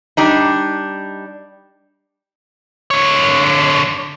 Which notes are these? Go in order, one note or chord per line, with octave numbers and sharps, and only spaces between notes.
G3 D4 D#4
D3 C#5